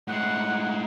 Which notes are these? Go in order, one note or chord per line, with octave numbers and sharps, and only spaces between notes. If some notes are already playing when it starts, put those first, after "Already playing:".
A2 G#3 F#5